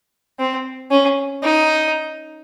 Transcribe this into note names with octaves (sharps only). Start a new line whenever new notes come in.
C4
C#4
D#4